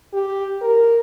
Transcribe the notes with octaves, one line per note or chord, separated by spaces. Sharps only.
G4
A#4